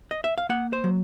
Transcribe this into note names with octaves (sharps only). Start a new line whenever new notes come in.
D#5
E5
F5
A#3 F#5
C5
F#3